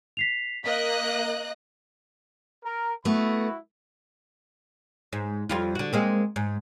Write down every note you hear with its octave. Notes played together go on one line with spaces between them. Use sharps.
B6 C7 F7
A#3 D#5 F#6 B6
A#4
A3 B3 E4 F#4 B5
G#2
F2 G3 F4
D3 F#4
G#3 A#3 C4
G#2